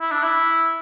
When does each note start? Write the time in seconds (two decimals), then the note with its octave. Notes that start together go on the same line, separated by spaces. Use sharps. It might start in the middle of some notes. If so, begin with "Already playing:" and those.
0.01 E4
0.12 D4
0.23 E4